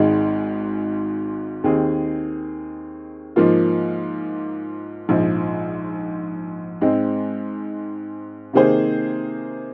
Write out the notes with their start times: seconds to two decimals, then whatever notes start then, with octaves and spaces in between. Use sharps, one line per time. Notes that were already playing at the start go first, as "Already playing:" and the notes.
Already playing: G#1 G#2 G#3
1.64 D#2 D#3 C4 G#4
3.36 G#2 F3 A#3 F4
5.09 A#1 G#2 F3
6.81 G#2 G#3 C4
8.53 C3 D#3 A#3 G#4 C5